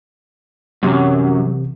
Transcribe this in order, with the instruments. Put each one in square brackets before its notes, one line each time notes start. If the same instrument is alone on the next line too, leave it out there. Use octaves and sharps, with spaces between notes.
[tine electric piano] A1 C3 E3 [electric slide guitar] F#2